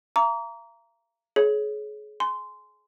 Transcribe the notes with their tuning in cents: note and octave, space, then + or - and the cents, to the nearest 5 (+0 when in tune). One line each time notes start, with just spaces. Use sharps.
F5 -45 A#5 +0 D6 -40
G#4 +30 C#5 +0
G#5 +10 C6 -15